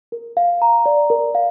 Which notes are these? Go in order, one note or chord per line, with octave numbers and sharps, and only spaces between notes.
A#4
F5
A#5
D5
A#4
F5